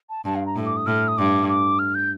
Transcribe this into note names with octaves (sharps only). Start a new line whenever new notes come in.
A5
G2 A5
F5
A#5
A2
D6
D#6
A2 F6
D#6
G2 D6
D6
F6
G6